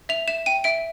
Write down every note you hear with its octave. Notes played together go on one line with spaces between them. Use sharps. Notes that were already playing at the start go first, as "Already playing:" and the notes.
E5 F7
E5 E7
G5 D#7
E5 D7